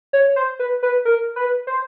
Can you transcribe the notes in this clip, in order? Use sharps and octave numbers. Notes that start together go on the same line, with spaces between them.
C#5
C5
B4
B4
A#4
B4
C5